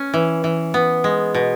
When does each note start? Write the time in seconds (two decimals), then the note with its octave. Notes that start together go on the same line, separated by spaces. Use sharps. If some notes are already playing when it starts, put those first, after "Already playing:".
Already playing: C#4
0.14 E3
0.44 E3
0.74 B3
1.04 G#3
1.35 B2